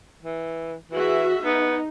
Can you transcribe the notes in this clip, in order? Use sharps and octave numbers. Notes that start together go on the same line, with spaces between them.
E3
E3 F#4 G#4 E5
B3 D#4